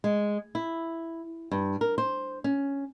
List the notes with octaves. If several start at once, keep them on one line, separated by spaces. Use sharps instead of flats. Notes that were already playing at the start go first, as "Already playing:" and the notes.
G#3
E4
G2
A#4
C5
C#4